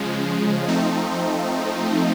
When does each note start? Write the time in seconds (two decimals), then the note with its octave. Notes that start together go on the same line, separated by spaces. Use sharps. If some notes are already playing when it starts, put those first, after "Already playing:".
Already playing: C#3 F3 G#3
0.68 F3 A3 C4 D#4